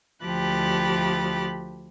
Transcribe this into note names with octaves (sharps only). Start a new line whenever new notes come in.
D2 F3 G4 B5 F#6 A6